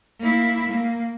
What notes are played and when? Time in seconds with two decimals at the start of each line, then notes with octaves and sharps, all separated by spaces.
0.20 A#3 E4
0.69 A#3